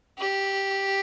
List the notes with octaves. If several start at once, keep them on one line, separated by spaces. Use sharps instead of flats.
G4